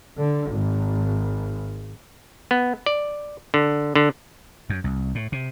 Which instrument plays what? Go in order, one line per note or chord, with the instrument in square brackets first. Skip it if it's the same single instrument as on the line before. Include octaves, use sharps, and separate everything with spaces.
[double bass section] D3
G#1
[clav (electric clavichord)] B3
D5
D3
D3
[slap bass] F#2
C2
A2
C3